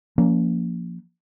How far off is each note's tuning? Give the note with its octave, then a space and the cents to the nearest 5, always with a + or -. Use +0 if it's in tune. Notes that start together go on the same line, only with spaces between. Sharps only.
F3 +0 A#3 +0 C#4 +35